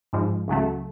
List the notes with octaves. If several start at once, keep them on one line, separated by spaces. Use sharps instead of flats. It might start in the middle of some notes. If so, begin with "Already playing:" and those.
G#2 F3 G#3
C#2 C#3 F#3 A3